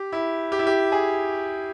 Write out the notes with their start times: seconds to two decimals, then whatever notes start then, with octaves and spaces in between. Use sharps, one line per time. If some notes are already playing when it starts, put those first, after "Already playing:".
Already playing: G4
0.12 E4
0.52 G4
0.59 E4
0.67 G4
0.92 G#4